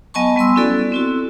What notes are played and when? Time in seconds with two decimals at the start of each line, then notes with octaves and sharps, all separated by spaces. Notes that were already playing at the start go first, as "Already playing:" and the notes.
0.14 F#3 B3 D#5 G#5 A5 C#6
0.36 G3 B3 C6 E6
0.56 C#4 E4 F#4 A4 D5
0.92 C4 E4 F#4